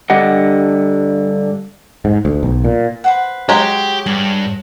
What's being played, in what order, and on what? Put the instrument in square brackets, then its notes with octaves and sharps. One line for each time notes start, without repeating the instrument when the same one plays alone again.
[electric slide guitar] G2 D3 G4 D#5 F#5
[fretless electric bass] G#2
D2
B1
A#2
[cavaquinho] B4 C5 F#5
[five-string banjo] F#3 G#3 [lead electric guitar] G4 G5
[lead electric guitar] G2 [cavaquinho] G#5 D6